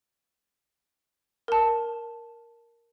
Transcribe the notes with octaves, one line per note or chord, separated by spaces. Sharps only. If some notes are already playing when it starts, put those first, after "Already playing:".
A#4 A5